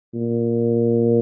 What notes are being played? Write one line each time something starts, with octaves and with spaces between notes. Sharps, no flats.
A#2